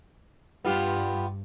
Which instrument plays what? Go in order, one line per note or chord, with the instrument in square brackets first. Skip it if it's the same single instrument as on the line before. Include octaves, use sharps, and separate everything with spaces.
[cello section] G2 [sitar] B3 F4 G4